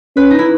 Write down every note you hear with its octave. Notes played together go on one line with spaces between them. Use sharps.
C#4 B4
D#4
E4